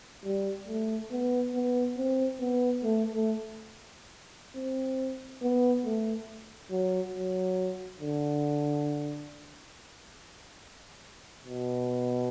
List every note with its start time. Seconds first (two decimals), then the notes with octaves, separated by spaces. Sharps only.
0.24 G3
0.68 A3
1.11 B3
1.55 B3
1.97 C4
2.40 B3
2.83 A3
3.13 A3
4.56 C4
5.42 B3
5.85 A3
6.71 F#3
7.14 F#3
8.00 D3
11.45 B2